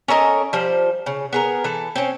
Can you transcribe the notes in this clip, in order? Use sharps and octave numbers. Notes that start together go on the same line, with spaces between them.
C#4 A4 A#4 D#5
F3 G3 C5
C#3
B3 G#4 A#4
E3 A4
C4 C#4